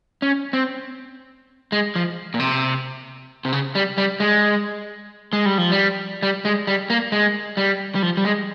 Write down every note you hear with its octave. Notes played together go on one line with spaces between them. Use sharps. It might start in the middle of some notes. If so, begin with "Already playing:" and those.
C#4
C4
G#3
F3
A#2
C3
C3
C#3
G3
G3
G#3
G#3
G3
F3
G3
G3
G#3
G3
A#3
G#3
G3
G3
F3
G3
G#3